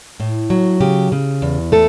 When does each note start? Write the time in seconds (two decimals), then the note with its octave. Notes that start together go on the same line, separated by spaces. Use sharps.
0.20 A2
0.50 F#3
0.80 C#3 G4
1.12 C#3
1.42 E2
1.72 A3 A4